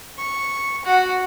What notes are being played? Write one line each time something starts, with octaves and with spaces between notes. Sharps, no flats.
C#6
F#4